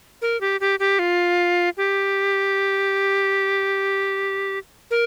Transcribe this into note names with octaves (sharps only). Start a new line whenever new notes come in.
A#4
G4
G4
G4
F4
G4
A#4